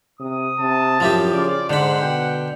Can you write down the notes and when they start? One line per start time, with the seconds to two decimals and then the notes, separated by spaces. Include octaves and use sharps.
0.20 C3 D#6
0.60 C3 A5
1.00 F#2 F3 E4 G4
1.33 C#3 F4 D5 D6
1.70 G#2 D3 C5 F#5 B5
2.02 B2 G5